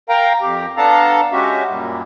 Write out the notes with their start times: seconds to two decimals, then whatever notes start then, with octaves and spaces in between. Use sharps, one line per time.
0.09 A#4 F5 G5 A#5
0.41 F2 G4
0.77 B3 D4 A4 F5 A5 A#5
1.32 G#3 C#4 F#4 G4 E5
1.68 F#2 A#2 G3